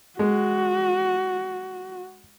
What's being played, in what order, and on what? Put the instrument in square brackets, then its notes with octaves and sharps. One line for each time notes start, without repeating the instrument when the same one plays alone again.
[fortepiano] G#3 [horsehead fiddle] F#4